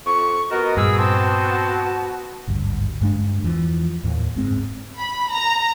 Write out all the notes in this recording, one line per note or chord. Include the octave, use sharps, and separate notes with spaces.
F2 C#6
B3 F#4 A#4 D#5
G2 A#2 G#4 E6
C4 A5
G#1 D2 G2
G2 G#3 D4
E2 E3 F3
D#2 A2
F#1 G#2 G#3 C4
B5
A#5